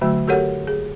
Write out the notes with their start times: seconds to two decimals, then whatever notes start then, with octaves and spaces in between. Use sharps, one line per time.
0.01 D3 F#3 A3 F#4
0.28 F#4 G4 A4 A#4 C#5 F#5
0.67 G#4